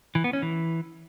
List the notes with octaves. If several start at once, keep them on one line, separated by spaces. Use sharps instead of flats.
E3
B3
C#4
E3